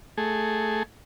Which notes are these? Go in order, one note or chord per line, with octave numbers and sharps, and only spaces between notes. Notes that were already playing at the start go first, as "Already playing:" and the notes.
A3 G#4